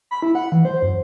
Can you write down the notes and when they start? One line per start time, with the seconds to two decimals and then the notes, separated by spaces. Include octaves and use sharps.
0.11 B5
0.22 E4
0.35 F#5
0.52 E3
0.65 C5
0.82 F#2